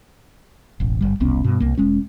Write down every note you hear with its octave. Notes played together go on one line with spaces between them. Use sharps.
E1 A1
G1 G3
E1 C2 B3 C#4
G2 B2
C2 A#3
E1 G#3 C#4